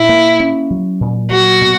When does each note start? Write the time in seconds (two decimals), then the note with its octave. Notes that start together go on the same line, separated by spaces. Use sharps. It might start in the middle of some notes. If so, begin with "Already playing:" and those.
Already playing: A#2 E4
0.09 A#3
0.40 C#4
0.70 F#3
1.01 A#2
1.31 F#3 F#4
1.61 B2